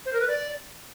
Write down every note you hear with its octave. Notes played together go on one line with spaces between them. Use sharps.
C5
A#4
B4
D5